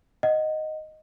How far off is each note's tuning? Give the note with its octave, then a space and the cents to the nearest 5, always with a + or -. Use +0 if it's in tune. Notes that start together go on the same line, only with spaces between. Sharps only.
D#5 +0 F#5 +0